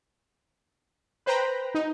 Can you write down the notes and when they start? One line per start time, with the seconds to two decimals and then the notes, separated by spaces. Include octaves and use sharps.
1.26 B4 C5 G5 A#5 B5
1.75 D#4